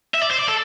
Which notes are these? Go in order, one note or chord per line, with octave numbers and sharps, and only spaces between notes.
E5
D5
C5
D5
A4